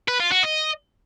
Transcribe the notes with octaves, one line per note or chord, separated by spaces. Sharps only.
B4
F4
F#4
D#5